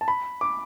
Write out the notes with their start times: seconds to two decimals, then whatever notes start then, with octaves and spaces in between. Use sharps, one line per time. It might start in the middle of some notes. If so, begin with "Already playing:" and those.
0.01 A5
0.08 B5
0.41 D6